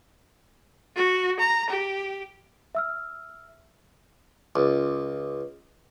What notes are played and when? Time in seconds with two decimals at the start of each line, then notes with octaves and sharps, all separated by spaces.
0.96 F#4
1.39 A#5
1.70 G4
2.75 E5 E6 F6
4.56 C#2